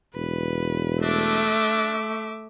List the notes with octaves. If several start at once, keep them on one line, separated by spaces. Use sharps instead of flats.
E1 B4
A3 D4 E5 D6